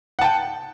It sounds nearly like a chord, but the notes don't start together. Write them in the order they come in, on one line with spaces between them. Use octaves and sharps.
F#5 A5 G5